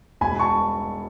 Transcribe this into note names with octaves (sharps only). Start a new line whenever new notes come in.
E1 G#5 B5
A5 C#6